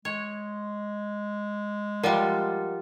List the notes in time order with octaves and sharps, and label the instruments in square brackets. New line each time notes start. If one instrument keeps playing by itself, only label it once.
[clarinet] G#3 [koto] C#5
[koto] F3 G3 [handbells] A#4 D5 F#5